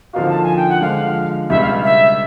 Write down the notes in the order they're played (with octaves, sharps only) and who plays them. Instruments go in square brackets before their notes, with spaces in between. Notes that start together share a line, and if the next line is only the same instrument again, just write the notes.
[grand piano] D3 F3 A#3 D#4 F#4 [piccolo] F5
[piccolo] A5
G#5
G5
F#5
[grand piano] D3 F3 G#3 [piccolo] F5
[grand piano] C#2 B2 G3 [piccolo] E5
[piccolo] F5
E5